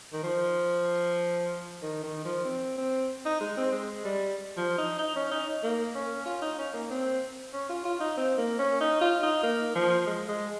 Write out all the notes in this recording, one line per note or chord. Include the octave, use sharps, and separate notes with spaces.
D#3
F3
D#3
D#3
F3
C4
C4
D#4
G#3
C4
G#3
G3
F3
D#4
D#4
C#4
D#4
A#3
C#4
F4
D#4
C#4
A#3
C4
C#4
F4
F4
D#4
C4
A#3
C#4
D#4
F4
D#4
A#3
F3
G#3
G#3